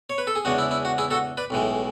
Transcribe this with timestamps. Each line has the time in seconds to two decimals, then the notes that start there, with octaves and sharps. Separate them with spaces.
0.10 C#5
0.18 B4
0.27 A4
0.36 G#4
0.45 E2 C#3 G#3 D4 F#4
0.58 E4
0.71 E4
0.85 F#4
0.98 E4 G#4
1.11 F#4 A4
1.37 B4 D5
1.50 B1 A2 E3 G#3